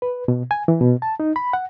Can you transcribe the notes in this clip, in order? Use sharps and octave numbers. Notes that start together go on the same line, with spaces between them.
B4
B2
G#5
E3
B2
A5
D#4
B5
F#5